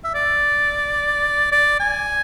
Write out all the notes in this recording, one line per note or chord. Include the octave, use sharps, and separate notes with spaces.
E5
D5
D5
G#5